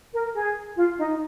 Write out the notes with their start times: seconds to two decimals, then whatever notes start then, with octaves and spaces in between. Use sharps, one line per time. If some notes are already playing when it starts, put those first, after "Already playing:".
0.13 A#4
0.34 G#4
0.77 F4
0.98 D#4